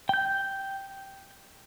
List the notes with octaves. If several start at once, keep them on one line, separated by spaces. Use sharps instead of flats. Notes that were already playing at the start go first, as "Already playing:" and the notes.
G5 G6